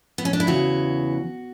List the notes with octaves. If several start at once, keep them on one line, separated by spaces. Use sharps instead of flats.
B3
C#4
D4
E4
E2 C#3 E3 F#4